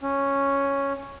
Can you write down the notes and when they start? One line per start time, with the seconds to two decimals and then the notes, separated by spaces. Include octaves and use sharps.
0.02 C#4